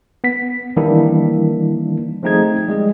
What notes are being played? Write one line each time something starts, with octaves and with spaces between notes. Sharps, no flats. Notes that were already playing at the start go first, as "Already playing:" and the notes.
B3 B6
D#3 E3 G3 A#3 D4 E4
F3 A3 C4 D#4 G#4 G#6
G3 G#3 G#4